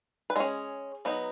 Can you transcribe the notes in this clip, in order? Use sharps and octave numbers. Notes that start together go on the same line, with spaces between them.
B4
G#3 C#4 G#4
F#3 B3 D#4